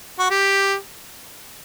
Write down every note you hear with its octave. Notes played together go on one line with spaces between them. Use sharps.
F#4
G4